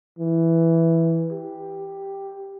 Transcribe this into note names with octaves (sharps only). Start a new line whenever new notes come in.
E3
G4